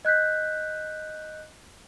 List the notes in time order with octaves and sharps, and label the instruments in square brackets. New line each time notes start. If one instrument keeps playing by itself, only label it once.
[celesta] D#5 F#6 G6 B6